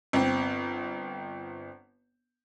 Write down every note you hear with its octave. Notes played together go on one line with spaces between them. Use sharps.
G1 C4